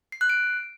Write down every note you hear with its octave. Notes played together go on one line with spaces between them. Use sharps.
C7
F#6
D7